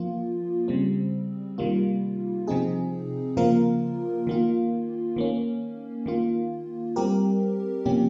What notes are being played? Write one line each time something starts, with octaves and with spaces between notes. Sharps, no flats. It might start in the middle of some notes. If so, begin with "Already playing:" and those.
Already playing: F3 A#3 F4
C#3 G3 C4
C3 D#3 G3 A#3 F4
C3 F3 C4 D#4 G#4
C#3 F3 A#3 F4 A#4
D#3 A#3 F4
D#3 A#3 C#4
D#3 A#3 F4
G3 C4 G4 A#4
C3 F3 A#3 C#4 G4